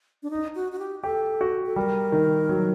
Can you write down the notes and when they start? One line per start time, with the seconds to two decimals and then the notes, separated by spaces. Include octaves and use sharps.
0.23 D4
0.31 D#4
0.55 F#4
0.72 F#4
0.79 G4
1.03 G4 A4
1.41 F#4
1.66 A4
1.76 G3 A#4
2.12 D#3
2.49 F#3